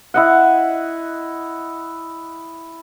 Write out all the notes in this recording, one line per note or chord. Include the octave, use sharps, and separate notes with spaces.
E4 D#5 F#5